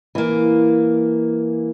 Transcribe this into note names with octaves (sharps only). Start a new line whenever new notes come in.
E3 A#3